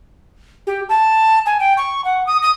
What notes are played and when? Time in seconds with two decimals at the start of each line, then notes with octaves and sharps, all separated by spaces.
0.67 G4
0.89 A5
1.46 G#5
1.60 G5
1.77 C#6
2.05 F#5
2.27 D#6
2.42 D#6